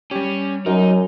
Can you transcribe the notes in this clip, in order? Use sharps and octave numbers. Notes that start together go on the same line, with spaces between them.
G3 C#4 G4
F#2 F#3 D#4 A#4